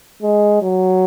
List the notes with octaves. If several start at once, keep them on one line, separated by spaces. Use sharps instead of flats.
G#3
F#3